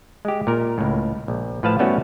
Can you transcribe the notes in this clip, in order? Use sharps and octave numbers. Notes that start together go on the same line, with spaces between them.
G#3 G4
A#2 A#4
C#2 A2
A#1
A2 F3 B4 F5 A5
G3 A3 B3 C#4 E4 F#4